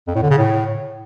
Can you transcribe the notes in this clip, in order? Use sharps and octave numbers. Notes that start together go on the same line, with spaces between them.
F2
A2
D3
C#3
A2